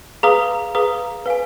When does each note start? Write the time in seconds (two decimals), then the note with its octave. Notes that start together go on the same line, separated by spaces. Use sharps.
0.23 G#4 B4 F5 A#5 D#6
0.75 G#4 B4 F5 A#5 D#6
1.26 B4 F5 G#5